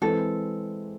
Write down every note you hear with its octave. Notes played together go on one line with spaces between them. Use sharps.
E3 G#3 C4 G#4 A4 B4